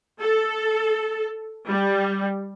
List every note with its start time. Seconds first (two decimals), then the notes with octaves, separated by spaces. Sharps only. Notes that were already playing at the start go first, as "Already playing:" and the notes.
0.20 A4
1.67 G3